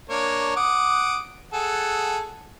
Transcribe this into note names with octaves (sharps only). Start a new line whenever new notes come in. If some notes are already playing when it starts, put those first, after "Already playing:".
A#3 D4 C#5
F#5 D6 D#6
G#4 A4 F#5